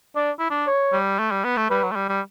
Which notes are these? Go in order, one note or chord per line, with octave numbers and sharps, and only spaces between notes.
D4 D5
E4
D4
C#5
G3
A3
G3
B3
A3
G3 B4
F#3
A3
G3
G3